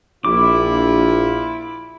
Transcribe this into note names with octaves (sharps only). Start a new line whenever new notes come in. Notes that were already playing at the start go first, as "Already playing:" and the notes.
A#1 E4 F4 D6